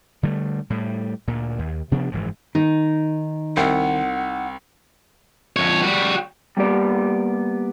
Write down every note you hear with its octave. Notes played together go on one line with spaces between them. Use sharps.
D3 G3 A3
A2 G3
D2 A#2
D#2
C3 F3 B3 D4
F#1 G#2 E3 F3
D#3 D#4
C2 F#5
F2 C#5
G3 F#4
G3 A#3 B3 G4 D5